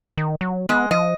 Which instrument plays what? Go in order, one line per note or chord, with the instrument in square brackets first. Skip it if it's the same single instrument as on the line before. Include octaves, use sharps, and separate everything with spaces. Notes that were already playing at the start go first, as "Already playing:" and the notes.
[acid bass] D#3
F#3
[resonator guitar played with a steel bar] G#3 D#5 [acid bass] B3
[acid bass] F3 [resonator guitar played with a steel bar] D#5